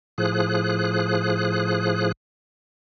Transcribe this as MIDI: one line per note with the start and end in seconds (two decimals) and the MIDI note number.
0.18 2.12 45
0.18 2.12 53
0.18 2.12 68
0.18 2.12 90